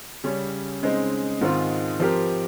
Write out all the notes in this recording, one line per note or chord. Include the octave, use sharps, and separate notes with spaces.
C#3 G3 C#4
C#3 G#3 C4 D#4
G#2 D#3 G#3 C4 F4
F3 C4 G4 A#4